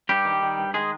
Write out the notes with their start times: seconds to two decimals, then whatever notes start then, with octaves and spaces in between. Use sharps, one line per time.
0.09 G2 G3 G4
0.25 D#3
0.42 D#3
0.58 G2
0.74 D#3 G#3 G#4